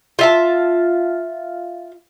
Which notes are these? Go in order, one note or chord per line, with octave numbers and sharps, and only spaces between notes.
F4 E5 A5